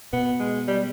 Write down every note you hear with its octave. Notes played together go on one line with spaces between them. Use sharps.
B2 B3
G#3
G3